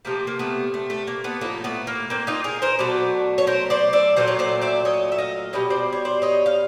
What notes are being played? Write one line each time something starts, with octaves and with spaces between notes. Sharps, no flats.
C3 F3 A3 A#3
A#3
A3 B3
A3
A3
A#3
A3 B3
A2 F3 A3 A#3
A3 B3
A#3
A#3 C4
D#4 F4
G#4 A#4
A#4 C5
B2 F#3 A3 D5
C#5
A#4 C5
C5 D5
D5 E5
A#2 F#3 A3 C5 D5
C#5
C5 D5
D5 E5
C#5 D#5
E5
D#5 F5
B2 G3 C#5 D#5
C5 D5
C#5
C5 D5
C#5 D#5
F5